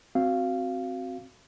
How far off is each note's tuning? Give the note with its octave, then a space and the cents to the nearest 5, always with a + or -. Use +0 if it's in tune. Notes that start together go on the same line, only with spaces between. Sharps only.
C4 +0 F#4 +0 F5 -10